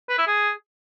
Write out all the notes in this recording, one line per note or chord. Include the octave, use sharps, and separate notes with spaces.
B4
E4
G#4